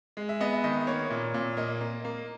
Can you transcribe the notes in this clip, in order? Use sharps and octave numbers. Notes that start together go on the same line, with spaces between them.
G#3
E5
B3 D#5
E5
D#3 D#5
A#3 C#5
A#2
A#2
A#3 D#5
A#3
A#3